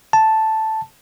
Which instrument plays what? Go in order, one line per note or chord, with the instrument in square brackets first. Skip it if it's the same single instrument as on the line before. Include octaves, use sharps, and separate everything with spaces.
[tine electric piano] A5